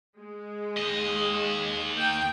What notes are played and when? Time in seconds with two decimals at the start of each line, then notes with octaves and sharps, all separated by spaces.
0.17 G#3
0.78 D#2 D#5
1.96 A#3 G5